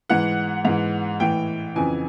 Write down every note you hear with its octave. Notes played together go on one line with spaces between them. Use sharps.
G#2 E3 F#5
G#2 E3
A2 E3 G5
F2 C#3 E3 G#5